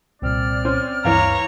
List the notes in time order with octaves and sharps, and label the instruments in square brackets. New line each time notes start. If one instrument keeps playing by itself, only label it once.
[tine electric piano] C2 A#2 [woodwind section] C4 D5 F6
[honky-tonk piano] C#4 C5
[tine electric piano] D2 G2 [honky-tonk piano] E3 F5 D7 [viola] C#5 A#5